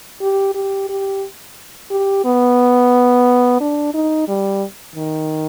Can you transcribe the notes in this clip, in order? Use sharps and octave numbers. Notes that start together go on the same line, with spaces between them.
G4
G4
G4
G4
B3
D4
D#4
G3
D#3